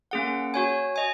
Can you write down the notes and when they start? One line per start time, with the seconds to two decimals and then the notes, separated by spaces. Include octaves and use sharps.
0.11 A#3 C#4 G#4 F#5
0.54 F#4 C#5 G#5
0.96 D#5 G#5